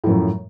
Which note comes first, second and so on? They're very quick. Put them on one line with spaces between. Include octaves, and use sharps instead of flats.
A2 F3 F#2